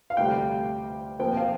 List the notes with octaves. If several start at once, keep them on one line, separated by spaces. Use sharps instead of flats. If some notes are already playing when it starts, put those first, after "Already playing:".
F5
D2 C3 G3 G5
A#2 F3 C4 G5
F5